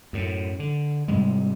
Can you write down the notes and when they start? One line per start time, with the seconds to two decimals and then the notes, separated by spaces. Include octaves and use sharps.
0.13 F#2 A2
0.59 D3
1.08 G#2 C3 G3 G#3